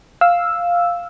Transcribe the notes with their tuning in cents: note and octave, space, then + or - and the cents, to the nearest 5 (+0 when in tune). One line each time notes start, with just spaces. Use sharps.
F5 +0 E6 +0